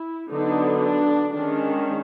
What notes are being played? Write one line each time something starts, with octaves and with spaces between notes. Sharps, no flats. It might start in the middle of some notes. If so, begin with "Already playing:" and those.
Already playing: E4
D3 F#3 B3 D4 D#4
D4
D#3 G#3 C#4 D4